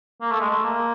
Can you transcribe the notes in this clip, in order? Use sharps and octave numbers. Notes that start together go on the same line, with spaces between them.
A#3
A3
G#3
A3
A#3